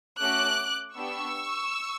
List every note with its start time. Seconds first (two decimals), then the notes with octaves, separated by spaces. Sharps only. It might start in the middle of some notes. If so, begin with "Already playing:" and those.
0.19 A3 C#4 F#4 D6 F#6
0.96 B3 D4 G4 C#6 E6